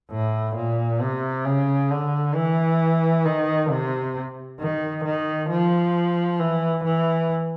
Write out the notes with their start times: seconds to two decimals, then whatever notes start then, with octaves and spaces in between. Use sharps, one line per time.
0.11 A2
0.56 A#2
1.01 C3
1.45 C#3
1.90 D3
2.35 E3
3.25 D#3
3.70 C3
4.60 D#3
5.05 D#3
5.50 F3
6.39 E3
6.84 E3